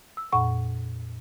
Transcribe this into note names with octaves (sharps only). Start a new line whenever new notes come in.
E6
F2 A#2 F#5 C#6